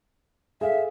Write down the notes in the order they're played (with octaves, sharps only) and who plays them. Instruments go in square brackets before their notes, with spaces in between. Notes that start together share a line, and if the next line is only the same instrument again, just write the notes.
[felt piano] G#4 A4 F5 [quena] E5